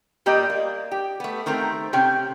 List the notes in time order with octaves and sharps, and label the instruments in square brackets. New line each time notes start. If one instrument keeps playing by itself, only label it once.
[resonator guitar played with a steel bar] A#2 G3 A#3 G4 D#5
A#3
G4
A3 B3
D#3 A3 C4 A#4
C3 C#4 G5